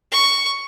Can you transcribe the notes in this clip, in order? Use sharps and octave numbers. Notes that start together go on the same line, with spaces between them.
C#6